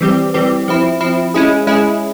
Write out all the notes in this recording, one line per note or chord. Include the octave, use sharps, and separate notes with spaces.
E3 G3 C4 G4
E3 G3 C4 G4
F3 C4 E4
F3 C4 E4
G#3 C#4 E4 G#4
G#3 C#4 E4 G#4